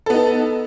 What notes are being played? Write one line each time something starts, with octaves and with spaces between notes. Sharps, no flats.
B3 D#4 A4